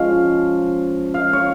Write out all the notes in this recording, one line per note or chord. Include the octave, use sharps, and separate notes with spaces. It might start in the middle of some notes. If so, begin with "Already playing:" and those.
Already playing: F3 G#3 C#4 F5
F5
C#5